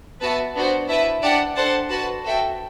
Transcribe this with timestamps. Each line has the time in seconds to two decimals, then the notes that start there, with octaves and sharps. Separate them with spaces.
0.20 B3 F#4 B4 E5 A5
0.55 B3 D4 F#4 C5
0.88 E4 B4 E5 A5
1.22 D4 G4 D5 F#5 A5
1.55 D4 A4 C5 F#5 A5
1.89 F#4 B4 F#5 A5
2.23 F#4 A4 E5 G5